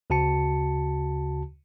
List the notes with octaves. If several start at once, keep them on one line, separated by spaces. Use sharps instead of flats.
D2 C#3 F#4 A5 C#7